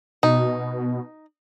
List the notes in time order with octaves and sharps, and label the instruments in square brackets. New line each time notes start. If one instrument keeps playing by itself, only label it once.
[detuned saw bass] B2 [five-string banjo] D#4